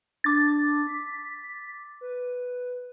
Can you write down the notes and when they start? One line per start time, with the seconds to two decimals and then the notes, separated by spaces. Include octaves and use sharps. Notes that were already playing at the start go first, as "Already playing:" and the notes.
0.24 D4 D6 A6
0.87 B6
2.01 B4